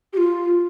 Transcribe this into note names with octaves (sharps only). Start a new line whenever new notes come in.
G4
F4